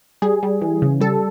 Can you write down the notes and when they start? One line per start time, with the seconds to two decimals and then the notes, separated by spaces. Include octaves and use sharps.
0.22 G3 G#4
0.43 G3
0.61 E3
0.82 C#3
1.00 G3 A4